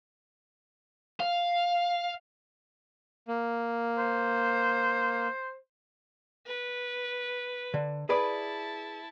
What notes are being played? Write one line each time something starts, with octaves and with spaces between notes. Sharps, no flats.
F5
A#3
C5
B4
D3
E4 G#4 B4 D5 A5